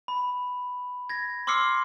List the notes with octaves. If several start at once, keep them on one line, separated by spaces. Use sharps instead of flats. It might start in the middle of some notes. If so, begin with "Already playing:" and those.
B5
G#6 A#6
C6 D6 E6 F6 C7 C#7